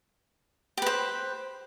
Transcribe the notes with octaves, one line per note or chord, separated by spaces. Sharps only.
G4 B4 C5